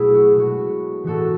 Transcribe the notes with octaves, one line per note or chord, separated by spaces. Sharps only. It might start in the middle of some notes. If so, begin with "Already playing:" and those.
Already playing: B2 F#3 A3 E4 G#4
F#4
B2 G#3 F#4
A2 E3 G#3 F#4 A4